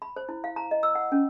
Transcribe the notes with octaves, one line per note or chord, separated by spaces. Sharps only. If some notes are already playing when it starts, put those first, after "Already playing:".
B5
C5
E4
F5
A#5
D#5
E6
F#5
C#4